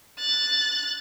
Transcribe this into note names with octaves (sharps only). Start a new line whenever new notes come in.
F#6 A6